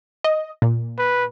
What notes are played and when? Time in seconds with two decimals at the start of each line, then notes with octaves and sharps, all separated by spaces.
0.24 D#5
0.62 A#2
0.98 B4